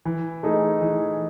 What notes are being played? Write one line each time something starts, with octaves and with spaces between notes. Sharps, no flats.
E3
A3 D#4 G#4
E3